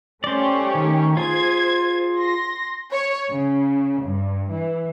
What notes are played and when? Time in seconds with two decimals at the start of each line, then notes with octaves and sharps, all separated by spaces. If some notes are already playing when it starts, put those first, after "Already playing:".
0.24 A3 C#4 G4 C5 D5
0.75 D#3
1.17 F4 G#4 C5 G#6
2.15 C6 A#6
2.91 C#5
3.31 C#3
4.03 G2
4.52 E3